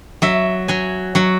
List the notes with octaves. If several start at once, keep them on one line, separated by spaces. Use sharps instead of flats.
F#3 E5
F#3 G#5
F#3 F#5